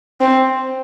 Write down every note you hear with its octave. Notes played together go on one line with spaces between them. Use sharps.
C4